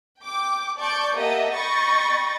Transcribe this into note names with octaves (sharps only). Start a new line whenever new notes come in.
G5 D6
D5 A5 C#6 G6 D7
A#3 G4 D#5 E5 F#5 A5
D#5 G5 B5 C#6 A6 A#6